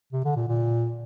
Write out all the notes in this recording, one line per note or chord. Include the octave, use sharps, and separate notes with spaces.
C3
D3
A#2
A#2